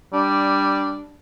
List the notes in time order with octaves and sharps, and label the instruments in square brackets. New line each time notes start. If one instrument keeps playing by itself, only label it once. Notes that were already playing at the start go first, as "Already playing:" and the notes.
[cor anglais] G3 [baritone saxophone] D4